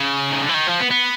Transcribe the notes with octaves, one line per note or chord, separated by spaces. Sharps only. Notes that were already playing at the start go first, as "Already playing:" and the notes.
Already playing: C#3
D#3
D3
E3
D#3
F3
B3
B3